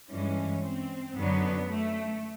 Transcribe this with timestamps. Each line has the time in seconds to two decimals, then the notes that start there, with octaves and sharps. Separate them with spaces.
0.10 G2 E3 G#3 C#4
0.63 C4
1.16 F#2 D3 F#3 B3
1.68 A3